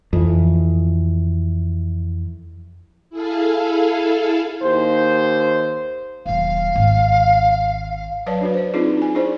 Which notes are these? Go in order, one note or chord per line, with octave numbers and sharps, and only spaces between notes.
F2 E3
E4 G#4 A4 F5
D#2 C5
D#1 F#3 F5
G#1
F#3 B4 C#5 D5 F5 A5
D4 F#4 B4
C5 D5
C4 D4 D#4 F4 G#4 D5
D4 G#5
D4 E4 G#4 C5 D5